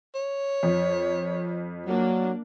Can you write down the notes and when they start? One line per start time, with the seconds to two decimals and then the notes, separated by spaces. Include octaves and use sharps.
0.15 C#5
0.63 F2
1.87 F#3 A#3 D4